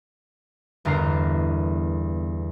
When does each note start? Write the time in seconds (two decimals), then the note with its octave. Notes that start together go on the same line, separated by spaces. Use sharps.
0.85 G1 E2 A4 A#4 A#5 C7